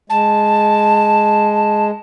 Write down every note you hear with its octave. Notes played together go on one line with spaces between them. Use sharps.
G#3 A5